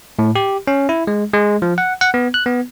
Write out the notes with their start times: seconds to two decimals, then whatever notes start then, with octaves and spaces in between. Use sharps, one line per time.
0.19 A2
0.36 G4
0.67 C#4
0.89 E4
1.07 G#3
1.33 G#3
1.62 F3
1.78 F#5
2.01 F#5
2.14 B3
2.34 F#6
2.46 B3